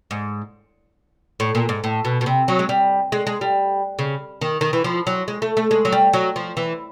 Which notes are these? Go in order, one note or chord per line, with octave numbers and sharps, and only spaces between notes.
G#2
A2
A#2
G#2
A2
B2
B2
C3
F#3
G#3
G3
G#3
G#3
G3
C#3
D#3
D#3
E3
F3
F#3
G#3
A3
A3
G#3
F#3
G3
F#3
F3
E3